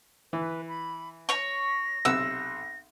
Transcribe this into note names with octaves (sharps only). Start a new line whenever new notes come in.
E3 B4
B5
C#5 C#6 A#6
B1 C3 F#5 E6